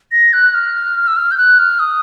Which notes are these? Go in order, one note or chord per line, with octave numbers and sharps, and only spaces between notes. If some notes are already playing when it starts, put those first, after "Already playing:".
A#6
F#6
F6
E6
F6
G6
F#6
F6
D#6